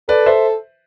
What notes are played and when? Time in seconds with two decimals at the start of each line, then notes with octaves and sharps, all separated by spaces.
0.09 A4 B4 D5
0.26 C5 E5